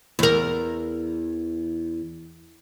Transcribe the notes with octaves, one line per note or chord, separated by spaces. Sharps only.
E2 A#4